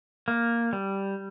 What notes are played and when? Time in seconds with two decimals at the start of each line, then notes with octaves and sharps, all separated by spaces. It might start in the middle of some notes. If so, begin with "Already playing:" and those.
0.28 A#3
0.73 G3